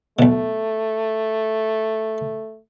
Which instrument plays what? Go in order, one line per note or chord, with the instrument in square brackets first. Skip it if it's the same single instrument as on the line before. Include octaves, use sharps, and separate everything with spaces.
[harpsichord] B1 B2 [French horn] A3